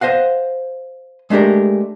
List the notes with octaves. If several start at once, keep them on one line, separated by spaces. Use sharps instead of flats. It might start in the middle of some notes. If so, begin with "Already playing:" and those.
C5 D#5 F5 F#5
G#3 A3 D4 G4 A#4